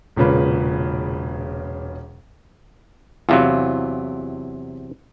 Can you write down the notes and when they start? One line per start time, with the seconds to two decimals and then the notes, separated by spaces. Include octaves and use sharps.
0.16 E1 A#2 C#3 B4
3.29 E2 C3 F#3 E4 F4